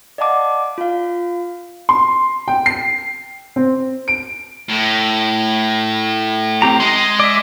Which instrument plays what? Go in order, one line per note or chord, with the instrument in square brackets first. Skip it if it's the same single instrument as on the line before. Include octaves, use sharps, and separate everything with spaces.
[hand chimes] D5 D#5 F5 F#5 A5 D6
F4 F5
[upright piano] C6
G5
C7
C4
D7
[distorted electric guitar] A2
[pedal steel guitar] C4 G4 A#5
[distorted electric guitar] G#3 D#5 [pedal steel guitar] C6
[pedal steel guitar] D5 E5